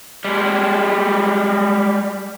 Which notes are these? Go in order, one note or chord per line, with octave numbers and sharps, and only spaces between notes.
G3 G#3